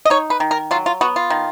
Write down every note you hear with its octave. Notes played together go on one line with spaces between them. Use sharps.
D#5
D#4 C#5
B4
D#3
A#4
F#3 F4
F4
B3 F#4
F4
D#3